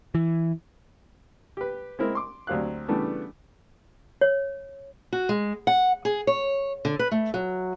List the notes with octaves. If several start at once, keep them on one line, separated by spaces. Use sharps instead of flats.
E3
G4 B4
G#3 A#3 C4 E4 A#4
C6 D6
D2 F#3 C4 G4 F5 F#6
C#3 E3 G3 A3 B3 D4
C#5
F#4
G#3
F#5
G#4
C#5
D3
B4
A3
F#3